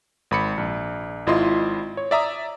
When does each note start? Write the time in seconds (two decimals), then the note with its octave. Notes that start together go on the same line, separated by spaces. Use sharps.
0.31 G#1 B5 C#7
0.58 A#1
1.27 G#1 E4 F4 D#5 C6
1.97 C#5
2.11 D5 E5 A#5 D#6